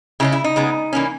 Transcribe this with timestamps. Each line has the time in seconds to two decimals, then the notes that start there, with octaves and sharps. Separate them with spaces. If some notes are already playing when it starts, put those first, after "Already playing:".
0.20 C#3 G#3 C#4 E4
0.32 E4
0.44 D#4
0.56 C#3 G#3 B3
0.93 E3 A#3 C#4